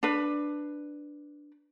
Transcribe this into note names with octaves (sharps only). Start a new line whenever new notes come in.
D4 B4